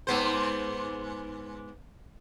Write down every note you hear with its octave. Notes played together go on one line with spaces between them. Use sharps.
G#2 B3 C5